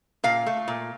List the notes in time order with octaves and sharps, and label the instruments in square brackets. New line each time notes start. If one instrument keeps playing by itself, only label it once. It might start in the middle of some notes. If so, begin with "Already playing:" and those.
[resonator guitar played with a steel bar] A#2 F5
A3
A#2